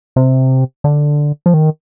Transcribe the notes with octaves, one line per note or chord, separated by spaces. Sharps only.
C3
D3
F3
D#3